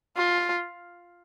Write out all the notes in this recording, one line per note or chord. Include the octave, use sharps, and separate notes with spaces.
F4